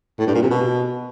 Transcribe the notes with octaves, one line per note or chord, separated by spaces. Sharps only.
A2
G2
A#2
C3
B2